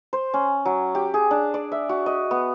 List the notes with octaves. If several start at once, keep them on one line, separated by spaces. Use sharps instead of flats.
C5
C#4
F#3
G4
G#4
D4
D5
E5
F#4
D#5
B3